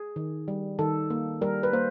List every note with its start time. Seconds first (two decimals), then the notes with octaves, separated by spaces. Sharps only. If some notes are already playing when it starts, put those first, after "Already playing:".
Already playing: G#4
0.16 D#3
0.48 G3
0.79 D#3 A4
1.10 A#3
1.41 G3 A#4
1.63 B4
1.73 A#3 C5